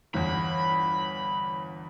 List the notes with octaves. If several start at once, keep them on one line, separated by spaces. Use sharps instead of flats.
G1 E2 B5